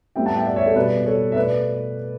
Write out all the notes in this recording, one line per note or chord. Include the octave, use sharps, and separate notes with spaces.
A2 G3 B3 E5 G5
F#5 A5
E5 G5
D5 F#5
C#5 E5
A4 C#5
B2 G3 B3 B4 D5
A4 C#5
E5
B2 A3 B4 D5